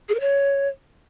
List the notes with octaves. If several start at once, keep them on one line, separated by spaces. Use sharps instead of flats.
G#4
A#4
C#5